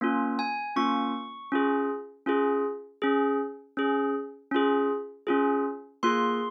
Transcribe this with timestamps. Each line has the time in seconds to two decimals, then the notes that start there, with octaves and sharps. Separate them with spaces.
0.01 A#3 C#4 F4
0.39 G#5
0.76 A#3 C#4 F4 C#6
1.52 C#4 F4 G#4
2.26 C#4 F4 G#4
3.02 C#4 G#4
3.77 C#4 G#4
4.51 C#4 F4 G#4
5.27 C#4 F4 G#4
6.03 A#3 F4 G#4 C6